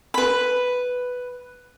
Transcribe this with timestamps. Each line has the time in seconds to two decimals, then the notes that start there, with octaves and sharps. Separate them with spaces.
0.14 B4 B5